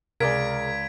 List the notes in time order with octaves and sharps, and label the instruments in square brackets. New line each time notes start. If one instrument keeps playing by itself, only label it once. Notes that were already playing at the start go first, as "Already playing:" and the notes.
[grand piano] C#2 D5 [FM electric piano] C3 G#4 [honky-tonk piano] A#4 [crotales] G#6 B6 D7